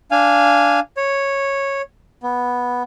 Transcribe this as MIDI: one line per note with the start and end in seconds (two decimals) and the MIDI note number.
0.11 0.80 62
0.11 0.80 77
0.11 0.80 80
0.97 1.82 73
2.23 2.83 59